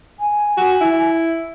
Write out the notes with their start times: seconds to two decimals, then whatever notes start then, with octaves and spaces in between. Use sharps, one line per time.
0.19 G#5
0.57 F#4
0.81 E4